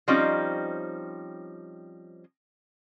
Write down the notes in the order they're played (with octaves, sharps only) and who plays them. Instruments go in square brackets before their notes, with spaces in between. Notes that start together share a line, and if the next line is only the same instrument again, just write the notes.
[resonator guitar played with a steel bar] F3 G3 C4 C#4 D#4